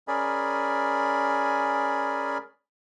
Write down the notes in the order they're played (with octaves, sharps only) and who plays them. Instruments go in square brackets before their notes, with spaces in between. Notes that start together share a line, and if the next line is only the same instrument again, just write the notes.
[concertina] C#4 G#4 A#4 D5 G#5 B5